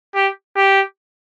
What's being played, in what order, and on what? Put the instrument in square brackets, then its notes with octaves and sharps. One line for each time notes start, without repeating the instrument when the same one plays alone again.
[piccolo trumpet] G4
G4